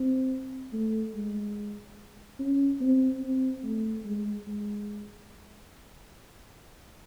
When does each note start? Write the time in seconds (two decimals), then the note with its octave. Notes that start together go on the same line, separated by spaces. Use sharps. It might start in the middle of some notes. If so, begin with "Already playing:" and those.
Already playing: C4
0.72 A3
1.14 G#3
2.39 C#4
2.80 C4
3.22 C4
3.64 A3
4.05 G#3
4.47 G#3